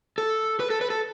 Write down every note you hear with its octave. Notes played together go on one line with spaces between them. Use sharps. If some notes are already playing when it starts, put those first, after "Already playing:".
A4
B4
A4
B4
A4